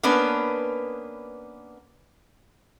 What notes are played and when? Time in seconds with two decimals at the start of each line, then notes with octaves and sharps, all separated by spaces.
0.03 A#3 B3 C#4 D4 B4